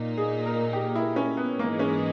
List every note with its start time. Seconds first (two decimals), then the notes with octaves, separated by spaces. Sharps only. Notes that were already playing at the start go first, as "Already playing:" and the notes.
Already playing: A#2 A#3 D#4
0.17 G#4
0.46 A#4
0.73 G4
0.95 E4
1.16 C#4
1.37 B3
1.58 G#2 E3 G#3 A#3 D#4
1.79 C#4